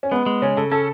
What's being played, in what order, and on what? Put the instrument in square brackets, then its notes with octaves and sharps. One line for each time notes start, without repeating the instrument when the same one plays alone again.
[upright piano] C#4
[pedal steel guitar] G#3 [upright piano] B3
[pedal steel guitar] G#3
[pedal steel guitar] C#3 [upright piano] C#4
[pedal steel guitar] C#3 [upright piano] A4
[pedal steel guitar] C#4 [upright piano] A4